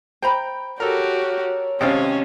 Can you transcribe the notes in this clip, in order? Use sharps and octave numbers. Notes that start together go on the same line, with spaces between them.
C5 G5 A#5 B5
F#4 G4 A4 A#4 C#5
G#1 C3 C#4 C5 D5 F5 G5